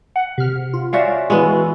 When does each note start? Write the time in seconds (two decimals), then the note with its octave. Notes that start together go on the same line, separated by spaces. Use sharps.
0.16 F#5
0.38 C3 F6
0.74 F4
0.93 C#4 F#4 C5 D5 E5 F5
1.30 E3 G#3 B3 E4 F#4